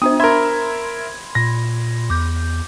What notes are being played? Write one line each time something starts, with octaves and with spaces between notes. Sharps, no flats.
B3 D4 C5 D#6
A#4 E5 B5 C6 G#6
A#2 A#6
E2 D6 G6